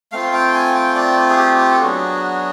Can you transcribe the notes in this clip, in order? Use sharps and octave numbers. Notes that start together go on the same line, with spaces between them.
A3 C4 F4 F5
G5
G#5
G5
D5
G#4
G4
G4
A4
F#3 B3 D4 F#4 G#4